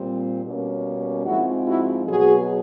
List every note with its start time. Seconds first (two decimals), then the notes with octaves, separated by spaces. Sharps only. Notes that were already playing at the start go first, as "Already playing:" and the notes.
Already playing: A#2 G3 C4
0.44 B2 G3 A#3 C#4
1.25 G#2 F3 G#3 C4 E4 F#4
1.67 E4 F#4
2.07 B2 F#3 B3 F#4 G#4